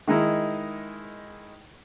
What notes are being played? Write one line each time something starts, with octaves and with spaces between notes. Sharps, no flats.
D#3 G#3 D#4 E4